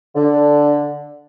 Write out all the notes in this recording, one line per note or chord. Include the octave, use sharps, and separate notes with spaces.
D3